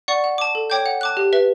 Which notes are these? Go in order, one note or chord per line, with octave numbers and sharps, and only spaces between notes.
D5 F#5 C#6
F#5
A5 D6
A4
C#5 G5 D6 G6
F#5
A5 D6 F#6
G4
B4 E5